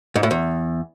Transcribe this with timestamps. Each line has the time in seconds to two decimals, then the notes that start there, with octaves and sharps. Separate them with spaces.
0.16 G#2
0.23 A2
0.31 E2